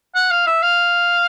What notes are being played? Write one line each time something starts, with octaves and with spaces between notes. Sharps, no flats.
F#5
F5
E5
F5